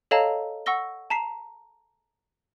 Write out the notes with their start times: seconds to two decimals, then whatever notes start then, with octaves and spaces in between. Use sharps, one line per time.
0.11 A4 C#5 D#5 F5 A5 A#5
0.66 F#5 C#6 E6 A#6 G7
1.10 A5 A#5 B6 C7